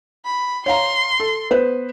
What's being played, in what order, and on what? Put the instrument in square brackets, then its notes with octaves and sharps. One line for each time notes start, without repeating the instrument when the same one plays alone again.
[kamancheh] B5
[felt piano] C#5 F5 A#5 [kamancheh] C6
[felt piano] A4
B3 B4 C5